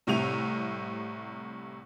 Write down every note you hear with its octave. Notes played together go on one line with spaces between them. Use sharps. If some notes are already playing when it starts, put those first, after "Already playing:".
C2 A2 C3 E5 F7